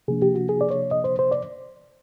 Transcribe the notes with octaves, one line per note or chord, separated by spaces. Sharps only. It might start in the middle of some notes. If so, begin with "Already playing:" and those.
C3 F3 A#3 D4 G#4
G4
F#4
G#4
D5
C#5
D#5
C5
C5
D5